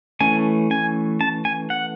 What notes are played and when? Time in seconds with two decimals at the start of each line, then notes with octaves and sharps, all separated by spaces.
0.21 E3 A3 C#4 G#5
0.71 G#5
1.21 A5
1.45 G#5
1.70 F#5